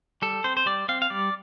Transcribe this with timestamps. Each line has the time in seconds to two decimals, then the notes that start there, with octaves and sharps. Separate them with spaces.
0.22 G3 A4
0.44 C4 C5
0.57 C5
0.66 G3 D5
0.89 C4 F5
1.02 F5
1.10 G3 D5